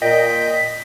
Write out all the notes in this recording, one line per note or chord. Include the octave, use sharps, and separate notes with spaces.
A#2 D#5 G5 B6